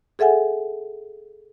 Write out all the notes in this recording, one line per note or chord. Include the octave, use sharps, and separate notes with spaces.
G#4 A4 E5 F#5 G#5